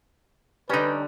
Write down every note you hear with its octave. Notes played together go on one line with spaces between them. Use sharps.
D3 G3 C#4 D#4 B4